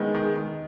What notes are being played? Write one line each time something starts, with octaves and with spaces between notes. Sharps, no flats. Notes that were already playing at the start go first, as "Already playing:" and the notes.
Already playing: D#3 G#3 B3
D#3
D#3